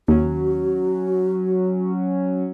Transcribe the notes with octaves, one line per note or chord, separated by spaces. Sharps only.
D#2 F#3 C#4 F#4